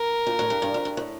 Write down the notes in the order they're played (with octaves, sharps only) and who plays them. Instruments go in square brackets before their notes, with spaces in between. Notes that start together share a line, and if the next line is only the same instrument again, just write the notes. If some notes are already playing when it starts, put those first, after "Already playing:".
Already playing: [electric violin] A#4
[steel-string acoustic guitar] A#2
A2
G2
G2
F2
G2
A2